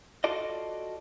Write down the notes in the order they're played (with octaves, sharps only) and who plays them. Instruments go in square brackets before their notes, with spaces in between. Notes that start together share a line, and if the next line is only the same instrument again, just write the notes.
[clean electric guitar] F4 F#4 A4 D5 D#5